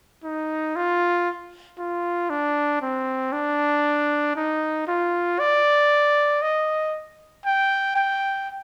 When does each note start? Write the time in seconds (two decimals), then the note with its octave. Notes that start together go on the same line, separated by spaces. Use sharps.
0.24 D#4
0.76 F4
1.78 F4
2.30 D4
2.82 C4
3.32 D4
4.36 D#4
4.88 F4
5.39 D5
6.42 D#5
7.46 G5
7.96 G5